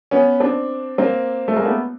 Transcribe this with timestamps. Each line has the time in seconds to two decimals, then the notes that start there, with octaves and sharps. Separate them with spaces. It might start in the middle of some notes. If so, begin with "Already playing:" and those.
0.11 B3 C#4
0.40 C4 D4
0.98 A#3 C4
1.48 A3
1.56 G#3 A#3
1.65 A3 B3